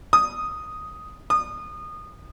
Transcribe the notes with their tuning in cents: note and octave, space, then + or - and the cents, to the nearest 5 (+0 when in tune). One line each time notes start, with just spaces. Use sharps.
D#6 +0
D#6 -25